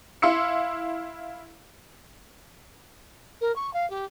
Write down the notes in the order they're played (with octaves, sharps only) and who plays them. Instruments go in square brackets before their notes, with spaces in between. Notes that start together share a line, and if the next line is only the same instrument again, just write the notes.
[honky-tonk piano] E4 F5 C6 E6 C#7
[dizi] A#4
C#6
F5
G4